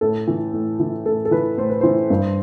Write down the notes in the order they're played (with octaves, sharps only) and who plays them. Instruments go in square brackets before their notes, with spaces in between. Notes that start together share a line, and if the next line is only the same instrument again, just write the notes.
[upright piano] A2 A4
E3
A2
E3
A2 A4
A4
E3 B4
A2 C5
B4
E3 C5
G2